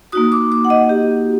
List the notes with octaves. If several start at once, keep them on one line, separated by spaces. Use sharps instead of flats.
A#3 D#4 F#4 D#6
D6
D6
F#5
D#5
G4